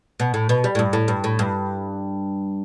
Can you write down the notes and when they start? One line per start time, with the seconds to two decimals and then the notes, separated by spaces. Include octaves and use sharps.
0.20 B2
0.34 A2
0.49 B2
0.64 G3
0.75 A2
0.79 G2
0.93 A2
1.08 G2
1.24 A2
1.39 G2